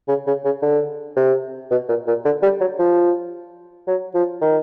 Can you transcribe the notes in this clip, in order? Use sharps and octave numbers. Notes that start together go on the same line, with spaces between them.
C#3
C#3
C#3
D3
C3
B2
A#2
A#2
D3
G3
F#3
F3
F#3
F3
D#3